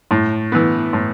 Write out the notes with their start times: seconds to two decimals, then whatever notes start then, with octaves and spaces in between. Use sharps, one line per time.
0.11 A2
0.52 E3 B3
0.93 A2